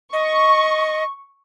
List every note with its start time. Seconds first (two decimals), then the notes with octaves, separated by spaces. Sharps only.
0.13 D#5 C#6